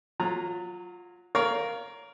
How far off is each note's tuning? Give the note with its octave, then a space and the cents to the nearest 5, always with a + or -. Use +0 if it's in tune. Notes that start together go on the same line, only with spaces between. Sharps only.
F#3 -15 F4 +10 A#5 +0
A#4 +0 C#5 +35 F5 +0